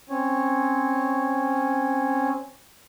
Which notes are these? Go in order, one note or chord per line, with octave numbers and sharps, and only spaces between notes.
C4 C#4 C#5